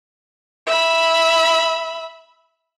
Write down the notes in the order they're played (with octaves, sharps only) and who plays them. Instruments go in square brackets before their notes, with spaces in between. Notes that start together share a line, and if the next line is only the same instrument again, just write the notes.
[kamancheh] E5 B5